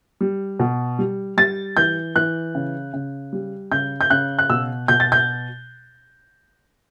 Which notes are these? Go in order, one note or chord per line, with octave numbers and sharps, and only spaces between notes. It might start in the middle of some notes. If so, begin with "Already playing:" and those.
G3
B2
G3
G3 A6
E3 G6
E3 F#6
C#3
C#3
G3
C#3 G6
G6
C#3 F#6
F#6
B2 E6
B2 G6
A6
G6